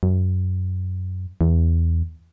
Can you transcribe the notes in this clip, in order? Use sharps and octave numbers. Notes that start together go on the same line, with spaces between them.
F#2
E2